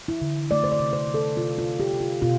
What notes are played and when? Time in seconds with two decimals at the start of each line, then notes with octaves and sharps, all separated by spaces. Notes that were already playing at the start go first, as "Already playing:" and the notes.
0.08 E4
0.21 D3
0.51 A3 D5
0.64 C5
0.72 D5
0.80 C3
0.93 C5
1.07 C3
1.14 A4
1.37 C3 F4
1.58 F4
1.64 C3
1.80 G4
1.93 C3
2.00 F4
2.22 B2 F4